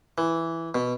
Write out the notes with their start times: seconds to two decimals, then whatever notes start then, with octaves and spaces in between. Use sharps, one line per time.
0.18 E3
0.75 B2